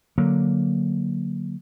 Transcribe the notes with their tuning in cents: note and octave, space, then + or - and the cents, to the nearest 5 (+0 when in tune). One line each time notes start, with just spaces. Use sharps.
D3 +0 F#3 +0 A#3 +0